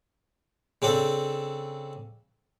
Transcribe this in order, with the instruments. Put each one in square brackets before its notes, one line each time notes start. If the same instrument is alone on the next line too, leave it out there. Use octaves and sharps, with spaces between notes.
[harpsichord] C#3 C4 D4 A4